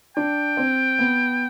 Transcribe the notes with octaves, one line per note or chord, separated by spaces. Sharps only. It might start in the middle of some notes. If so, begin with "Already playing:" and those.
D4 G5
C4
B3